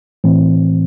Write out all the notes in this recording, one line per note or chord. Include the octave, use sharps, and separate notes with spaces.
A2 E3 C4